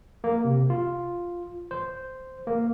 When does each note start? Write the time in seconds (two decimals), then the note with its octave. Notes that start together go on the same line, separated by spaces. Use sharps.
0.24 A#3
0.44 C3
0.70 F4
1.71 C5
2.47 A#3